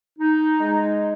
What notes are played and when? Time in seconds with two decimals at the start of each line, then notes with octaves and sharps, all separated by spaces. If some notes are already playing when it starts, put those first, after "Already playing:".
0.17 D#4
0.60 G#3